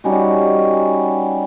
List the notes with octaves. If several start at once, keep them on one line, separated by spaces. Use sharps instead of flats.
G3 C#4 D#4 F#4